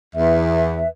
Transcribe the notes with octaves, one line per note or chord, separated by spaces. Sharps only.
E2 B4 E5